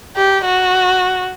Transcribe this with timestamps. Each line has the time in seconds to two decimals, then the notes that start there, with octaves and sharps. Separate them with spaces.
0.16 G4
0.45 F#4